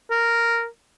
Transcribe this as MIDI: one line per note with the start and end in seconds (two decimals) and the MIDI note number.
0.11 0.66 70